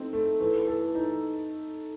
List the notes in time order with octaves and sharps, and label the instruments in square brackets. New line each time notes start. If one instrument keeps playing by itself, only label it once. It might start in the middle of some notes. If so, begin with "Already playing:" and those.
Already playing: [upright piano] A3 C4 D#4
A3
[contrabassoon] E3 [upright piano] A3
[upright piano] A4
D#4